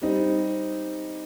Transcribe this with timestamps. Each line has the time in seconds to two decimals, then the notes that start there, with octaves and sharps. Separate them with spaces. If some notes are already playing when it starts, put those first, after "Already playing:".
0.01 G3 C4 D#4